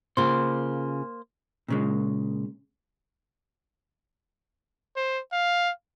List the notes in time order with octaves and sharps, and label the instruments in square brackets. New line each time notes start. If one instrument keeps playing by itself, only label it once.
[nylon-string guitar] C#3 F4 [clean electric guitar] A#3 C5
[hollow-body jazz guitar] A#2 C#3 G#3
[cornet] C5
F5